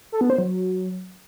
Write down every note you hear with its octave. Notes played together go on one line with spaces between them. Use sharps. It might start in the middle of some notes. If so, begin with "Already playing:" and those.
A4
B3
C5
F#3